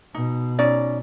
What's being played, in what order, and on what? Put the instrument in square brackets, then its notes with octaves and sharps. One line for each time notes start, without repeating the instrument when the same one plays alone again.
[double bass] B2 [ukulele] D#4
[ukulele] C#4 D#4 D5